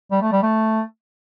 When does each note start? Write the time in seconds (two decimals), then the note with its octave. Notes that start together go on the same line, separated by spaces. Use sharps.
0.11 G3
0.22 A3
0.32 G3
0.42 A3